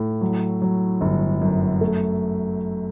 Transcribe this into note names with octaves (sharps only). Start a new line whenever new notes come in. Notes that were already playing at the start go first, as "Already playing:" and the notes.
Already playing: A2
F#3
F#3
G1
F#2
A3